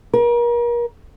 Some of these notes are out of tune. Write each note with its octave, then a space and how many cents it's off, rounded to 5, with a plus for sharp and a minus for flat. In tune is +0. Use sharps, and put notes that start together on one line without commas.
A#4 +35